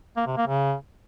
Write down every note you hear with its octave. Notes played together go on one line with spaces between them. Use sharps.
A#3
C3
A#3
C#3